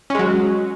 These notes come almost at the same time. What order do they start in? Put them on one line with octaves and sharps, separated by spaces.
C#4 G#3 F#3